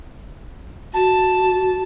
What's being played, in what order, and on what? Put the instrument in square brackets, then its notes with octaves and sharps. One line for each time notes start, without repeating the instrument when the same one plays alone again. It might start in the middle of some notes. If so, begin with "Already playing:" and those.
[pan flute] F#4 [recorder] A5